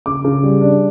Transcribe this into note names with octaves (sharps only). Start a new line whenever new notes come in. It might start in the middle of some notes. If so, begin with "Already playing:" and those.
C#3 D6
C#3
G3
D4